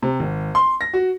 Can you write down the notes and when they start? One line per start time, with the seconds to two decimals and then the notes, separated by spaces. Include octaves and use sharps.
0.02 C3
0.20 G#1
0.55 C6
0.81 A#6
0.94 F#4